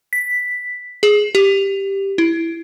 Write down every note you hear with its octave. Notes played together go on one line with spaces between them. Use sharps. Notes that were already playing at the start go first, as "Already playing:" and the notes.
B6
G#4
G4
E4